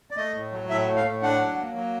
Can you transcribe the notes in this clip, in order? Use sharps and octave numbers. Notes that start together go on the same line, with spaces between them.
D5
A3 D#5
A2
F#3
A2 E5
A3
F5
A2
D4 F#5
F#3
A#3
F#3